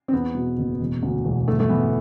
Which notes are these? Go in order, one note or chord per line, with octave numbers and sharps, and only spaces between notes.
C4
E2 B3
B2
F#1
E1
D2
E1
G1 A3
A3
E3 B3